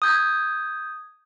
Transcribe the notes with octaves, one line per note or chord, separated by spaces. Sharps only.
D#6 G6 G#6